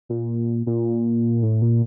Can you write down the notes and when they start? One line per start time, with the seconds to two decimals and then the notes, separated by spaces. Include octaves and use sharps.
0.09 A#2
0.66 A#2
1.42 A2
1.62 A#2